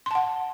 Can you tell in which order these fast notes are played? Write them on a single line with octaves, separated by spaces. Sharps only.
C6 A5 F#5